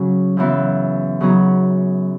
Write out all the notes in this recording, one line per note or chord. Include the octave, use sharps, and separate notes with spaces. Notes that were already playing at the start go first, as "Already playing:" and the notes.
Already playing: C#3 F#3 C#4
F#2 C#3 E3 B3
C#3 F#3 B3 D#4 G#4